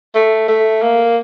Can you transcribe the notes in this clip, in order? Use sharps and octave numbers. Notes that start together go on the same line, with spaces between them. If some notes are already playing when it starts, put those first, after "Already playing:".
A3
A3
A#3